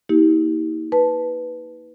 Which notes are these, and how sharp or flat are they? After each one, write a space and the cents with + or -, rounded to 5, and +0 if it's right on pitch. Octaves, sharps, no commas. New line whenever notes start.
A#3 +0 D#4 +45 G4 +0
B4 +0 A5 -10